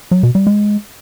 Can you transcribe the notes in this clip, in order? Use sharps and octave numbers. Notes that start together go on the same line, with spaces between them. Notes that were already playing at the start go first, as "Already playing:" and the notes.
F#3
B2
G3
G#3